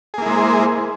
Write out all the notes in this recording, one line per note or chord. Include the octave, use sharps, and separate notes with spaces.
G#3 A#3 E4 G#4 C5